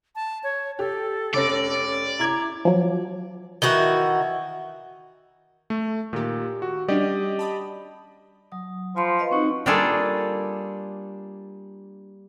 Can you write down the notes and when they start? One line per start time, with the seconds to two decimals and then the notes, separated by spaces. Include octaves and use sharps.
0.15 A5
0.43 C#5
0.79 G4 A4
1.34 F1 C#4 D5 A#6
2.19 E4 A#5 D6 G#6
2.65 F3 F#3
3.62 D#3 E3 F#4 G6
5.70 A3
6.13 A#2 D#3 G4
6.62 F#4
6.88 G3 C#4 D4 G4 D5 D#5
7.39 A5 B5 D#6
8.52 F#3 D#6
8.96 F3 F4 B5 C6
9.19 B4 D#5 F5
9.31 C4 D#4 F#4
9.66 G3 A#3 D4 F4 G#4 A4